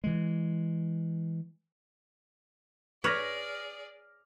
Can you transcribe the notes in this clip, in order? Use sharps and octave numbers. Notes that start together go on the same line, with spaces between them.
E3 G#3
G#4 B4 C#5 D5 D6 F6 A#6